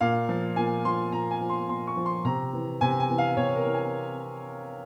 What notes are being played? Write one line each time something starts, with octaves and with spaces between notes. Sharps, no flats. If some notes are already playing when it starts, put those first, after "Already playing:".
A#2 F5
F3
A#2 G#5
F3 C6
A#2 A#5
G#5
F3
C6
A#2 C6
C#6
F3
C6
C3 A#5
E3
C3 G#5
G#5
E3
F5
C3 C#5
A#4
E3
G#5